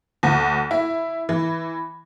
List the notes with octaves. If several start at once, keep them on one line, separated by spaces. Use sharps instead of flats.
D2
E4
E3